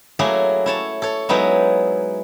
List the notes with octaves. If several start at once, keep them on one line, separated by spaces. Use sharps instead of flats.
F#3 A3 A#3 E4 G#4
E4 C#5 A5
A4 C#5
F#3 G#3 B3 D#4 E4